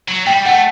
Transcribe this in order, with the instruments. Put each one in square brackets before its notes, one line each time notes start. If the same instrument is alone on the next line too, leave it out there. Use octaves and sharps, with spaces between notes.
[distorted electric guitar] F#3
[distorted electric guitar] G3 [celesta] G5
[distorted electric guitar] A3 [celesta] F#5